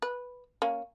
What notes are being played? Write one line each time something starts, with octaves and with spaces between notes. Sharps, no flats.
B4
A#3 C#4